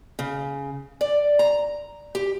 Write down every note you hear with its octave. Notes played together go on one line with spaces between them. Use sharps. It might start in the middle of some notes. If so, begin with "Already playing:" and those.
C#3
D5
A#5
G4